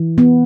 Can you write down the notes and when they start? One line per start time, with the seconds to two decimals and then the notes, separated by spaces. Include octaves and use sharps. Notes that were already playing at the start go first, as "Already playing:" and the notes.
Already playing: E3
0.18 B3